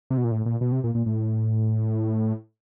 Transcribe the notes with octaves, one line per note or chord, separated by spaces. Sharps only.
C3
B2
A#2
A2
A#2
B2
C3
A#2
A#2
A2